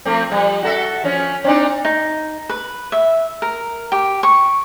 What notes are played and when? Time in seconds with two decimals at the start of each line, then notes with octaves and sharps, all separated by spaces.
0.05 F3 A3 C4
0.30 F3 G3
0.63 F#4 A4 E5
1.04 F3 C#4
1.44 C4 D4 D#4
1.85 D#4
2.49 B4
2.92 E5
3.42 A#4
3.92 G4
4.23 C#6